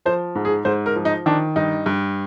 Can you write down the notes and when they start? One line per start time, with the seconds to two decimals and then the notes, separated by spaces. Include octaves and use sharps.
0.06 F3 C5
0.35 G#2
0.45 G#4
0.65 G#2 C5
0.86 A#4
0.96 F3
1.05 D#4
1.26 D#3 D4
1.56 G2 D#4
1.86 G2